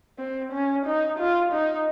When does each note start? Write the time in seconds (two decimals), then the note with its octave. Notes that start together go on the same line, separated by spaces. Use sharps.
0.18 C4
0.52 C#4
0.86 D#4
1.19 F4
1.52 D#4